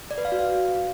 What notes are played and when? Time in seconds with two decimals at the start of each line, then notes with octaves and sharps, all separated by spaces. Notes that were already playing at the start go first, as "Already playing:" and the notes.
0.11 D5
0.18 B4
0.25 F5
0.32 F#4
0.39 F5